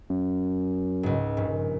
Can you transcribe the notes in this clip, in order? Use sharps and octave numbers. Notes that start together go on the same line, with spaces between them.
F#2
C#2 G#2
A#1 G2